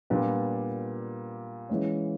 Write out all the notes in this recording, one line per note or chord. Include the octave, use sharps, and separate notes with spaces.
A#2 G3 B3 D4
E3 G#3 C#4